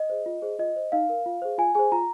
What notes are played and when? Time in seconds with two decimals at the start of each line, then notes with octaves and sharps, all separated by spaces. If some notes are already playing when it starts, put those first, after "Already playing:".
Already playing: D#5
0.10 G#4 C5
0.26 F4
0.42 G#4 C5
0.59 F4 D#5
0.76 C5
0.92 D#4 F5
1.09 A#4
1.26 F4
1.42 G#4 C5
1.58 F4 G#5
1.75 G#4 C5 G#5
1.92 F4 A#5